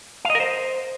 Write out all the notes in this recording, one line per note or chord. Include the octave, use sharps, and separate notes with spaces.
F5
D#5
A#4
C5